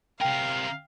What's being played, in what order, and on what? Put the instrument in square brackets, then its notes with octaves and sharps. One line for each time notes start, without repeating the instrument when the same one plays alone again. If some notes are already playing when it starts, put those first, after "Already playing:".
[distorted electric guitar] C3 A#4 [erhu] F5 [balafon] G5